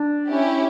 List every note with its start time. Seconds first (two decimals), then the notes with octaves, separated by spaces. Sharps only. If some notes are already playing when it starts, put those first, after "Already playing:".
Already playing: D4
0.27 C#4 E4 G4